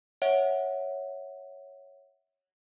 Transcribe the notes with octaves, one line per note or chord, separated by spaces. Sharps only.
C#5 E5 F#5